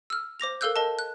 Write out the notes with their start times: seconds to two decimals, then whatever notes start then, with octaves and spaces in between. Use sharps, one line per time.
0.10 E6 F6
0.40 C5 D6 A#6 F7
0.61 A4 A#4 F5 E6 F#6 G6
0.76 A#4 D#5 A5
0.99 F#6